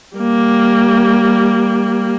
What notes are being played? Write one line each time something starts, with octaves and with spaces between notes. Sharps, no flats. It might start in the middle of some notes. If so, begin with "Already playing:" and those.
G3 A#3